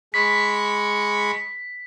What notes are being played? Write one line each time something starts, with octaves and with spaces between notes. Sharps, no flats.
G#3 B5 C#6 B6